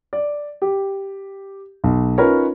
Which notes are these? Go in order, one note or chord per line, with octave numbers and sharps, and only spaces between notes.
D5
G4
B1
C#4 D#4 F4 A#4 B4 C#5